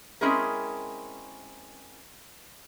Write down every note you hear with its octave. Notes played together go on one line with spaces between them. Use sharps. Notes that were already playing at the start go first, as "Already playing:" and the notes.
G#3 C4 C#4 E4 G#4 A#4